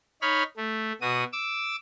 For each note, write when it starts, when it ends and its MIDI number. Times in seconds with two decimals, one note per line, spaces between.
0.22 0.43 63
0.22 0.43 73
0.22 0.43 83
0.22 0.43 89
0.57 0.92 57
1.01 1.24 47
1.01 1.24 66
1.01 1.24 87
1.33 1.76 86
1.33 1.76 88